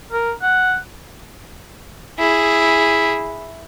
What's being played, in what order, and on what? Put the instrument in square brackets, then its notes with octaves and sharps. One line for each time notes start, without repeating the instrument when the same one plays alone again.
[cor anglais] A#4
F#5
[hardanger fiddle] E4 G#4